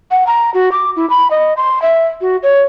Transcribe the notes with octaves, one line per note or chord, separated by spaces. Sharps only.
F#5
A#5
F#4
D6
E4
B5
D#5
C6
E5
F#4
C#5